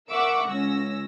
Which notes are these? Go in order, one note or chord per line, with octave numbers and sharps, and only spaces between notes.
A#4 E5 F#5 C#6 D6 E6
C#2 C#4 E6 A#6